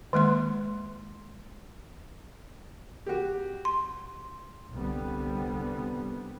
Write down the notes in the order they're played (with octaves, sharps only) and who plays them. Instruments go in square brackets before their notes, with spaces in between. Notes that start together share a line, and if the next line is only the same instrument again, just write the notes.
[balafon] D#3 G#3 A#3 C6
[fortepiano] F#4 G4
[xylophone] C6
[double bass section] C2 D3 G3 B3